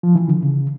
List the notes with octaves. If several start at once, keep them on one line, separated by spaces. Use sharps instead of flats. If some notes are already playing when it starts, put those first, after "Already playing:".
F3
E3
D3
C#3